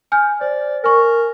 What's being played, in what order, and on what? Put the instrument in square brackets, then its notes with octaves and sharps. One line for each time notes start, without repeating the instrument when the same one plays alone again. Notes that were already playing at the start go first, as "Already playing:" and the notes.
[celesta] G#5 F6 G6
[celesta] C5 [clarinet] D5
[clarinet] A#4 [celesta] G#5 C#6